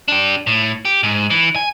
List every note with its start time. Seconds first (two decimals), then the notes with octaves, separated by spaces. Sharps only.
0.08 D4 G4
0.47 A2
0.85 G4
1.03 G#2
1.30 E3
1.56 G#5